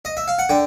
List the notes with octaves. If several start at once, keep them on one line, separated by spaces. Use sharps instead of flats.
D#5
E5
F5
F#5
D3 G5